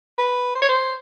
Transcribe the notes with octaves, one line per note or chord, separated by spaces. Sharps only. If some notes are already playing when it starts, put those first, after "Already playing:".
B4
C5
C#5
C5